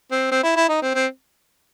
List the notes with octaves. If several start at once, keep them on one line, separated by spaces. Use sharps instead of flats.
C4
C4
E4
E4
D#4
C4
C4